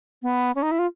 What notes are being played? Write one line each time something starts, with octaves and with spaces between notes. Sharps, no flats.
B3
C#4
D#4
E4
F4